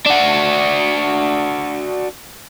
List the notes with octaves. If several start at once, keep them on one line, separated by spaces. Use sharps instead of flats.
D4 F#4